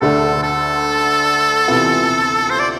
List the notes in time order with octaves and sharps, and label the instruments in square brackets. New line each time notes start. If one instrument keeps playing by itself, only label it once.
[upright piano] D2 D3 A3 D4 [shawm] A4
[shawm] A4
[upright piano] C3 E3 B3 F4
[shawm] C5
D5